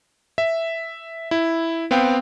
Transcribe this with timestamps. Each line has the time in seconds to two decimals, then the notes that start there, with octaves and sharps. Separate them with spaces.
0.38 E5
1.31 E4
1.91 B3 C4 F5 G5